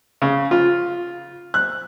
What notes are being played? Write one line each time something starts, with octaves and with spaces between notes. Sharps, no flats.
C#3
F4
F#6